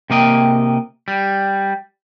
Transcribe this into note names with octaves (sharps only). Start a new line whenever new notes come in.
C3 A#3 D#5 G5
G3